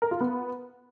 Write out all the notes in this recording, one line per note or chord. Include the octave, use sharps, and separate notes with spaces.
A#4
F4
B3